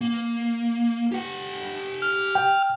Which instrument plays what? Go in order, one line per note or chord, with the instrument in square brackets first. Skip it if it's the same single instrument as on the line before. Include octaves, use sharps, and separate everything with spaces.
[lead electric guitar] A#3
G4 F#5
[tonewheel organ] F6
[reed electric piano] G5